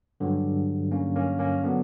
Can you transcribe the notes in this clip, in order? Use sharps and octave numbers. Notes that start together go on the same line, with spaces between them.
G2 D3 F#3
A#3 C#4
A#3 C#4
A#3 C#4
D3 F#3 B3 D4